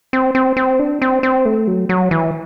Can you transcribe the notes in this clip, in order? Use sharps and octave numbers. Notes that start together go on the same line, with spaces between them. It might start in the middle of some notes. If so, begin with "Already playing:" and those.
C4
C4
C4
D4
C4
C4
A3
F#3
F#3
E3